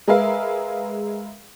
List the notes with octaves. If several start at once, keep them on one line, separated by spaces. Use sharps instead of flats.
G#3 G#4 A#4 B4 E5 F5